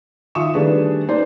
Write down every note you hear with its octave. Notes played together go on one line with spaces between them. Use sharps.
D#3 F4 E5 C#6 D#6 E7
D#3 G3 A3 D4 G#4 B4
D4 D#4 B4 C5 D5